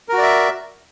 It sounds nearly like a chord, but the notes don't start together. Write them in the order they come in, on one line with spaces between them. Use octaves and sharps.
A#4 F#4 D5 E5